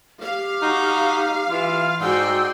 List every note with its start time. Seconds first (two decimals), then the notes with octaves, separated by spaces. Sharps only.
0.22 G4 F5
0.62 D#4 F#4
1.50 E3 F4
2.01 G#2 F#4 D5 G5 C6 E6